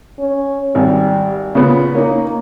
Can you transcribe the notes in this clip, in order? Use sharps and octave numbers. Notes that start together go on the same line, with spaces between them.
C#4
G#1 G3
A#2 C#3 B3
A#3 C#4 D#4